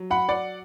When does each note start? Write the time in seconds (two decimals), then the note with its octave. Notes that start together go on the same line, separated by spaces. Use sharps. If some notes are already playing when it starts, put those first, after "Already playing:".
Already playing: F#3
0.11 F#5 B5
0.29 D5 F#5